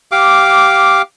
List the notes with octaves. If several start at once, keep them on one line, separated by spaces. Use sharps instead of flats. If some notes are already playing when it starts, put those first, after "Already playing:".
G4 F5 D6